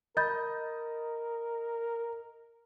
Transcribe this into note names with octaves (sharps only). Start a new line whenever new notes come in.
A#4 D#5 B5 G6 A6